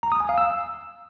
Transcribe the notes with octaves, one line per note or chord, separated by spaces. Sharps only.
A#5
D#6
G#5
F5
E6